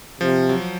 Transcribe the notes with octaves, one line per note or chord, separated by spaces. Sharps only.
C3 F3
F#3